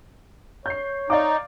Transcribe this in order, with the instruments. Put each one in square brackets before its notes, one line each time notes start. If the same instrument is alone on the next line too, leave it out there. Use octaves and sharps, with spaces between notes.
[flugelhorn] C#5 [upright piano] G6 C7
[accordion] D#4 [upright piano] D5 F5 D6